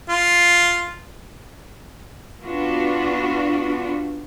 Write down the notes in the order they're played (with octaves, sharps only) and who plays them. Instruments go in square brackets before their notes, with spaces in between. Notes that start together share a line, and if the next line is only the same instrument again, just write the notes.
[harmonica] F4
[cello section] B3 D4 F4 F#4